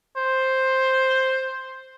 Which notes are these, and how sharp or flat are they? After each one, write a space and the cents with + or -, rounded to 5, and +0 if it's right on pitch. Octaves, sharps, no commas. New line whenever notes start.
C5 +5